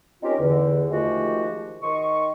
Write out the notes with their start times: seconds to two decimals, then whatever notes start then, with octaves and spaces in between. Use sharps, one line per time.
0.23 C4 C#4 D#4 F4 G4 A#4
0.39 E2 D3
0.90 D#3 F3 G#3 A3 F#4 G4
1.82 D#3 D#5 C6 C#6